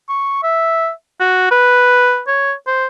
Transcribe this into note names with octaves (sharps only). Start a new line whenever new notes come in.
C#6
E5
F#4
B4
C#5
C5